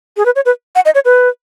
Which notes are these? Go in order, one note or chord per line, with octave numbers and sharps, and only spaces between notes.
G#4
B4
C#5
B4
F#5
D#5
C#5
B4